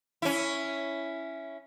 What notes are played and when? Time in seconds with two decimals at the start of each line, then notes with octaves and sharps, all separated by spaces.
0.22 C#4 E4